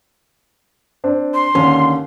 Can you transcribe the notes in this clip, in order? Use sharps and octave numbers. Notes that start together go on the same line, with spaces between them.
C4 D4 C5
C6
D#2 D3 C#4